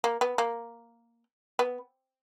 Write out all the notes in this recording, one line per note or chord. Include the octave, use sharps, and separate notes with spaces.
A#3
B3
A#3
B3